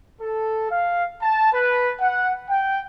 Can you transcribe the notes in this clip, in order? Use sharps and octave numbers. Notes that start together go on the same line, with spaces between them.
A4
F5
A5
B4
F#5
G5